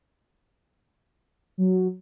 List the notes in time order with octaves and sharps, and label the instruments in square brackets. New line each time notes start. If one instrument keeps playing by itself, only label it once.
[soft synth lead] F#3